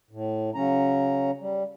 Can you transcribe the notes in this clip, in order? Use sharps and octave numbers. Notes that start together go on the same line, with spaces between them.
A2
C#3 F#3 C#4 A#5
G3